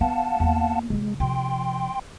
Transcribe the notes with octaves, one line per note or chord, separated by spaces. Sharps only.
B3 F5 F#5 A5
E2 A#3
C3 E3 G#3
C3 F3 G5 C6